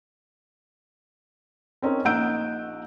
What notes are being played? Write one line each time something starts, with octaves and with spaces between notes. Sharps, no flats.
C4 C#4 D#4 A#4
A#1 D#4 F#5 E6 G6 D7